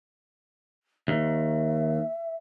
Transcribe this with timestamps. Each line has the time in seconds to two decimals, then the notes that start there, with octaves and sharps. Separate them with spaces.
1.08 D#2 E5